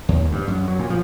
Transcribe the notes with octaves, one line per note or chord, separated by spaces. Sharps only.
D#2
G2
F#2
F#3
A#2
F3